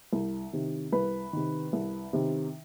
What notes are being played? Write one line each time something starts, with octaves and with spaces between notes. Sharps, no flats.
C2
C3 D#3
C2 B4
C3 D#3
C2
C3 D#3